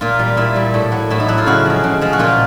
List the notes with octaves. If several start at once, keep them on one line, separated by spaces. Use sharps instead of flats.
A#2 F4
G3 F4
A#2 E4
G3
A2
F#3
A2 E4
D#4
F#3 E4
F4
C#3 F#4
F3 G#3
C#3
F3 G#3
F#4
A#2 F4